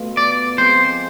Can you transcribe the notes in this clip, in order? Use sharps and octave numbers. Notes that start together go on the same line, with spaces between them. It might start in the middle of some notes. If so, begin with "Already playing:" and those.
Already playing: B2 A3 B3 F4
D5
F3 G#3 C4 G#4 C5